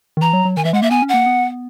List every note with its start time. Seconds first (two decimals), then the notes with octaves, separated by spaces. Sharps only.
0.17 D#3
0.21 E3 A#5
0.33 F#3
0.45 F#3
0.57 D#3 G#5
0.65 E3 E5
0.73 G#3 F#5
0.82 A#3 E5
0.91 B3 G#5
1.02 C#4
1.09 A#3 F#5
1.26 B3